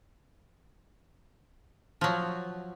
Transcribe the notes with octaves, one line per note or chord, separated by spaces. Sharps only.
F3 F#3